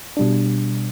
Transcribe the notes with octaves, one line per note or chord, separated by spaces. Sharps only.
B2 G3 D4